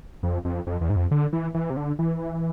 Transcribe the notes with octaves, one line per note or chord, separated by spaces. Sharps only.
F2
F2
F2
E2
G#2
F2
D3
E3
E3
C3
D3
E3